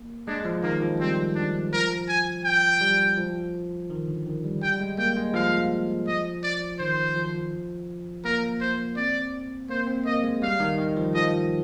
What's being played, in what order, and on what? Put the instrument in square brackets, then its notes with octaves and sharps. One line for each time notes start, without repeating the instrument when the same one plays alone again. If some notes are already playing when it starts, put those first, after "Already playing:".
Already playing: [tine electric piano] A#3
[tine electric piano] G#3 [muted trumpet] D4
[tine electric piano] F3
[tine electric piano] D#3 [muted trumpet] A#3
[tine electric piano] F3
[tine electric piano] G3 [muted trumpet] C4
[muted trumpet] D4
[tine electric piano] F3 [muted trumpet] A#4
[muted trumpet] G#5
G5
[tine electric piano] G3
F3
D#3
D3
D#3
G3
[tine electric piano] G3 [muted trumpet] G5
[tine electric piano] G#3
[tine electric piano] A#3 [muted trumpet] G5
[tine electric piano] G#3
[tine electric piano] F3 [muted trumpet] F5
[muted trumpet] D#5
D5
[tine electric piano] D#3 [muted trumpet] C5
[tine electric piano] F3
[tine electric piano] A#3 [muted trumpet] A#4
[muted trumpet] C5
[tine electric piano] C4 [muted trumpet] D5
[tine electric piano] A#3 [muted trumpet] C5
[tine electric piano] C4
[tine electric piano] A#3 [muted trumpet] D#5
[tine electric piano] G#3
[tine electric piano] G3 [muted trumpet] F5
[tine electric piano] D#3
D#3
F3
[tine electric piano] F3 [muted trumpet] D#5